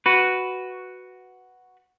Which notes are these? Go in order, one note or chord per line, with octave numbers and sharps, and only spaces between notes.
F#4 B4